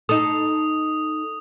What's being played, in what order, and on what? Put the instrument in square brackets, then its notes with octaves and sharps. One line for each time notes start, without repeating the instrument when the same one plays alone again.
[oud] D#4 A4 [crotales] D#6